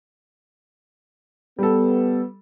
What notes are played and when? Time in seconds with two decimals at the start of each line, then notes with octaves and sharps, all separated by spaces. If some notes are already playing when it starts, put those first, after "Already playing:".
1.59 G3 B3 A4